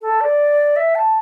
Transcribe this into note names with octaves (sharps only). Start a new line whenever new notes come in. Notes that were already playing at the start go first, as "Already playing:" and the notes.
A4
D5
E5
A5